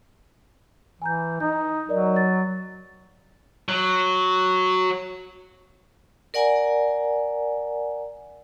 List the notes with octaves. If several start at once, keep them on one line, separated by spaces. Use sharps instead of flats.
E3 G#5 A#5 G6
D#4 G6
F#3 A#4 D5 D#5
A6
F#3
A#4 D5 F#5 G#5 A#5